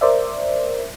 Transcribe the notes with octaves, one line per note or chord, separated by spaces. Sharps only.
A#4 C5 D5 E5